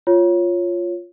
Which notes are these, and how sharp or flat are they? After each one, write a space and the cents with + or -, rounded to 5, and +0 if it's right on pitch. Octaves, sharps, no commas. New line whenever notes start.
F4 +0 C#5 -5